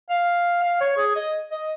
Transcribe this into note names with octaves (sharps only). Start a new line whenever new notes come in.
F5
F5
C#5
G#4
D#5
D#5